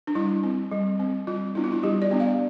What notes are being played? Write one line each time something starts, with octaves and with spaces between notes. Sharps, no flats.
D4
G3 E4
C4
G3
C4
G3 F4
B3 D4 E4
F4
E4
G3 G4
D5
B3 D4
F5